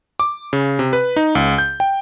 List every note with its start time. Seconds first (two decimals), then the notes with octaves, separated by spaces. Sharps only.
0.20 D6
0.53 C#3
0.79 C3
0.93 B4
1.16 D#4
1.35 C#2
1.58 G6
1.80 G5